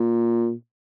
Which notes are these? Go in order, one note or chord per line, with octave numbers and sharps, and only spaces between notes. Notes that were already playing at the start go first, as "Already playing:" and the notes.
Already playing: A#2